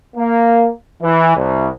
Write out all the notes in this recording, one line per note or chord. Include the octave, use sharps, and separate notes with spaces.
A#3
E3
C2